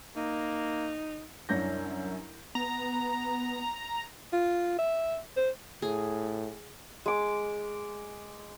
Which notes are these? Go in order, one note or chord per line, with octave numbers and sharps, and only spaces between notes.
A#3 D#4
C2 F#2 D4 C#5 G6 A#6
B3 A#5
F4
E5
C5
A2 G#4
G#3 D6